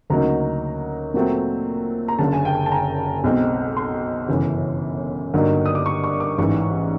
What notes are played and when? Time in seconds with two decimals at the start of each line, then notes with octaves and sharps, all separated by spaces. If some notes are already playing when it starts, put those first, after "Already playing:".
0.10 D2 C#3 F#3 A#3 D#4 A#5
1.14 A#2 F#3 A3 C4
2.08 A#5
2.19 F#1 F#2 D3 A5
2.33 G#5
2.45 G5
2.66 A5
2.72 A#5
3.24 B1 B2 G#3 C4
3.77 C6
4.29 G1 F#2 C#3 E3
5.34 G2 D3 F#3 A#3 D#4
5.66 D#6
5.75 D6
5.86 C#6
6.04 C#6
6.20 D6
6.38 A1 G#2 E3 C#6